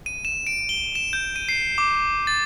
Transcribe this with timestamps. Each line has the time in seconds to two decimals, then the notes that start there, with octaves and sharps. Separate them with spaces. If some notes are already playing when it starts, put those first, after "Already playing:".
0.06 D#7
0.25 E7
0.47 D7
0.69 G7
0.95 E7
1.13 G6
1.36 D#7
1.49 C7
1.78 D6
2.27 A6